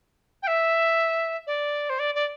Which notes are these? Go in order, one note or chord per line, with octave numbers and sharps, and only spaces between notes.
G5
E5
D5
C5
D5
D5